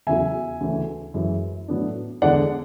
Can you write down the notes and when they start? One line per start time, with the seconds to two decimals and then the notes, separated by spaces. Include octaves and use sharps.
0.07 E2 C#3 F#3 E5 G#5
0.61 D2 C#3 E3
1.14 F#2 E3 G#3
1.68 A2 F#3 B3 D4
2.22 E2 D3 G#3 D4 D5 F#5